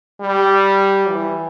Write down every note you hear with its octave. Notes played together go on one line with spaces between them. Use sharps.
G3
E3